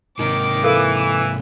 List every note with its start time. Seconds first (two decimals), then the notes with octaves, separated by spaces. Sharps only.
0.19 G#2 C3 D#3 D#4 D6
0.64 E3 A4 A#4 F5